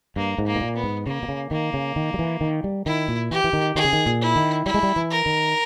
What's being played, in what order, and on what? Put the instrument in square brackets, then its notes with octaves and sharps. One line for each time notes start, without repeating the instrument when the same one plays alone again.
[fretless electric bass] G2 [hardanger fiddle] A#3
[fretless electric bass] G#2
[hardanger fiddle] A#3
[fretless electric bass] B2
A#2
[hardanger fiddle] B3
[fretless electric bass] G#2
[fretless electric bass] C#3 [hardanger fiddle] A#3
[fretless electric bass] B2
C#3
[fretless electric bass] D#3 [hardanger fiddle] A#3
[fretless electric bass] C#3
D#3
G3
E3
D#3
G3
[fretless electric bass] D#3 [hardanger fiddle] E4
[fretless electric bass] A#2
[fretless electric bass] E3 [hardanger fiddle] G4
[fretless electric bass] E3
D#3
[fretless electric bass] D#3 [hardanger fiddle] G#4
[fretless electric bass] C#3
D#3
A#2
[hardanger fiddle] E4
[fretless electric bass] D#3
[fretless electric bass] G3 [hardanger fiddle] E4
[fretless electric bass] G#3
G3
E3
[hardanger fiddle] A#4
[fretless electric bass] D#3